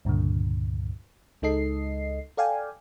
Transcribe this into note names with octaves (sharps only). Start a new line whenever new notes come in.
C#2 G2 A#2 D3
C#2 G#3 D#4 A4 D#5 C7
A4 D5 F5 G5 G#5